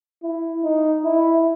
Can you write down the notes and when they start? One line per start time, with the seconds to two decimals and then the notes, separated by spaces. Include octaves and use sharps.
0.23 E4
0.64 D#4
1.04 E4